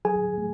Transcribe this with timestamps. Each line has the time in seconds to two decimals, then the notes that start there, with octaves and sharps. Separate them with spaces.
0.05 F#3 G#4 G#5
0.38 A3